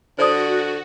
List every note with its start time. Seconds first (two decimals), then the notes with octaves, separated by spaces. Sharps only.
0.19 D3 F#4 C5 D5 D#6